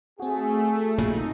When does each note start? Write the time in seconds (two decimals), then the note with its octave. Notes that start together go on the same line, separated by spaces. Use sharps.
0.20 A3 C4 F#4 G#4
0.98 A#1 A#2 C#3 D#4